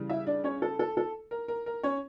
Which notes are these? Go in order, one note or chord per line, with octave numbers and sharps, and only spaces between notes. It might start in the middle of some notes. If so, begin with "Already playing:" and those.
Already playing: C#3 E3 G3
E4 E5
D4 D5
C#4 C#5
A4
A4
A4
A#4
A#4
A#4
C#4 C#5